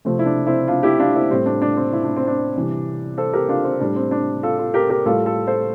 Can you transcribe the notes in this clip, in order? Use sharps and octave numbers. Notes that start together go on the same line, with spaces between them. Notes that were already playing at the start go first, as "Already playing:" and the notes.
C3 F3 A3 C4
E4
D4
C4 E4
D4 F4
E4 G4
D4 F4
C4 E4
A2 G3 C4
D4
D4
C4
E4
D4
C4
D4
C3 E3 G3
A4 C5
G4 A#4
D4 F4
C4
A2 G3 D4
C4
D4
F4 A4
F4 A4
G4 A#4
G4 A#4
A2 G3 F4 A4
F4 A4
A4 C5